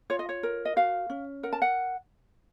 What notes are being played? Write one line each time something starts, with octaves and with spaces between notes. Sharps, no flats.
F4 C#5
D#5
C#5
A#4
D#5
F#4 F5
C#4
A#4 F#5
A5
F#5